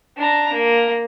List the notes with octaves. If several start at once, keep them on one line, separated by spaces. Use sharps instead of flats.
D4 A#5
A#3